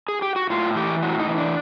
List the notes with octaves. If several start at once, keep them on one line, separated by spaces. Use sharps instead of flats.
G#4
G4
F#4
A2 F4
E3 G4
A2 F#4
D#4
E3
D4